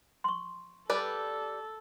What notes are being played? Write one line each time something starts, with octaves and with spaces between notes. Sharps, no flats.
C6 C#6
G3 A4 B4 D5